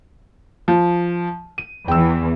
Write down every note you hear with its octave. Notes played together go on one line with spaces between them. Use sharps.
F3
D#7
E2 E3 G5 E6